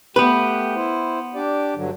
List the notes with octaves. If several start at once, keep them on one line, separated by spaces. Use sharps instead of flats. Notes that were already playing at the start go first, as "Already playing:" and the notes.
A3 B3 G4 B4 G5
E4 C5
D4 G4 D5
G2 D3 F#3